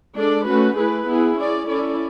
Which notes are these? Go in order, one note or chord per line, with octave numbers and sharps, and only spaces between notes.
G#3 D4 A4 D5
A3 C#4 F#4 B4
A3 E4 G#4 B4
B3 E4 G#4
C#4 G#4 D5
C#4 E4 A4 D5